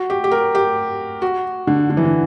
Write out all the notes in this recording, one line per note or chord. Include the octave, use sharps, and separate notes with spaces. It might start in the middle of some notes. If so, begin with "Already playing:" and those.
Already playing: F#4
G4
G4
A#4
G4
F#4
D3
D3
E3
D3